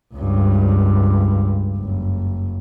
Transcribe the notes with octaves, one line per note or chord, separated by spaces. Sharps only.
C#2 G2
F#1